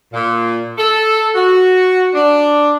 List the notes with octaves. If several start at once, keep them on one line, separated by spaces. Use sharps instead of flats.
A#2
A4
F#4
D4